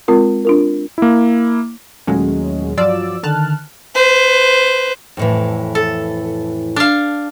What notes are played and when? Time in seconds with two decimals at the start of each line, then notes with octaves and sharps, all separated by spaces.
0.08 G#3 C4 F4 A#4
0.45 D4 F4 A#4
0.98 A#3 E4
2.07 D#2 A#2 F#3 G#3 A3 C#4
2.78 G2 F3 F#3 F4 D5 E6
3.23 D3 D#3 A5 F6 F#6
3.95 B4 C5
5.17 F2 A2 E3
5.75 A4
6.76 D4 F5